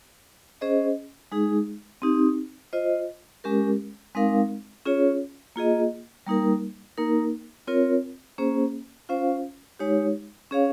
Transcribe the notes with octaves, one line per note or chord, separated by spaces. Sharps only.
C#4 G#4 C5 D#5
G#3 D#4 G#4
C4 D#4 G4
F4 C5 D#5
G#3 C#4 G4 A#4
G#3 C4 D#4 A#4 F5
C#4 F4 G#4 C#5
A#3 F4 G#4 D#5
G3 A#3 D#4 A#4
A#3 D#4 A#4
C4 F4 A#4 C#5
A#3 C#4 G#4 C5
C#4 F4 C5 F5
G#3 D#4 G4 C#5
C#4 G#4 C#5 F5